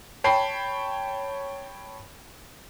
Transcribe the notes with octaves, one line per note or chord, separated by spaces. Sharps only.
C#5 G5 A5 B5 C7